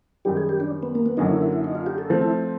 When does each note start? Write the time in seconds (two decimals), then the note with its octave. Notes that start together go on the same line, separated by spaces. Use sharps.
0.25 F#2 D#3 G3 G4
0.37 G#4
0.49 G4
0.60 D4
0.83 B3
0.95 A#3
1.06 B3
1.17 F#2 D3 F#3 A#3 D#4
1.30 E4
1.41 E4
1.52 E4
1.64 D#4
1.75 F4
1.86 G4
1.98 A4
2.10 F3 A3 C4
2.22 E4